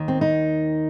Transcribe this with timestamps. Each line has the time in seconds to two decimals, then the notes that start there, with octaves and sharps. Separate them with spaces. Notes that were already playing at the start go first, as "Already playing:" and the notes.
Already playing: D#2 D#3
0.08 C4
0.21 D#4